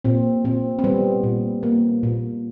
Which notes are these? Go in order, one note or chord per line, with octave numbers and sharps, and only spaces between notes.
A#2 C4
A#2 C4
C4
G3 B3
A#2
A#3
A#2